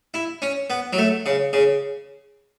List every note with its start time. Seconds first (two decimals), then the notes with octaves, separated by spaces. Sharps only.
0.14 E4
0.42 C#4
0.70 B3
0.93 F#3
0.98 A3
1.26 C#3
1.53 C#3